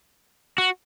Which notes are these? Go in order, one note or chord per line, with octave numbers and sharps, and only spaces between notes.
F#4